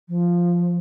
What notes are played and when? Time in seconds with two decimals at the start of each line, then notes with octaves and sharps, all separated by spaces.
0.09 F3